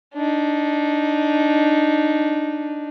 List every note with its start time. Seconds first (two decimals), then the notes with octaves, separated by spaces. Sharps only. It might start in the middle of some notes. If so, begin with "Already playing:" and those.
0.14 D4 D#4